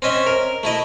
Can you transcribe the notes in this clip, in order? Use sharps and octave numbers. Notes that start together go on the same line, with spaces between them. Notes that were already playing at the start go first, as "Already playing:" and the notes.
C4 C#4 D#5 E5
A#4
A3 E4 D#5